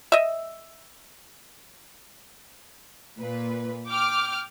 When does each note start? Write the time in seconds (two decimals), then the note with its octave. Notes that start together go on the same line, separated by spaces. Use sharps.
0.12 D#5 E5
3.19 A#2 B4
3.87 G5 D6 F6